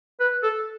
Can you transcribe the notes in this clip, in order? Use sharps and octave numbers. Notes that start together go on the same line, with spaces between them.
B4
A4